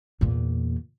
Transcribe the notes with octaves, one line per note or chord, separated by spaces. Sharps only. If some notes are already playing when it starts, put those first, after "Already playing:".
E2 A#2